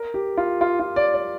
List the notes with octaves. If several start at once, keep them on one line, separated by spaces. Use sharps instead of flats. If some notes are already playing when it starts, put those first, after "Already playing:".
Already playing: A#4
G4
F4
F4
F4
D5
D5